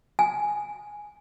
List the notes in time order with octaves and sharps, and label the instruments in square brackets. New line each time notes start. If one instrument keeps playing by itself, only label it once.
[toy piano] G#5